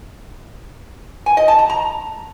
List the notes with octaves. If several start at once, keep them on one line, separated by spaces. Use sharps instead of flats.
G#5
D#5
A5
A#5
A#5